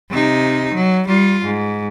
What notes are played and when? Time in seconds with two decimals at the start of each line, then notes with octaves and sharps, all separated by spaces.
0.10 C3 D#4
0.74 F#3
1.07 G3 F4
1.44 G#2